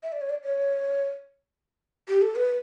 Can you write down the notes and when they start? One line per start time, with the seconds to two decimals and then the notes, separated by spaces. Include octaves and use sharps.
0.03 E5
0.12 D5
0.21 C#5
0.30 D5
0.44 C#5
2.08 G4
2.22 A4
2.36 B4